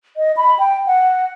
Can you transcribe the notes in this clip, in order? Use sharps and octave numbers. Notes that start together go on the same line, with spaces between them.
D#5
B5
G5
F#5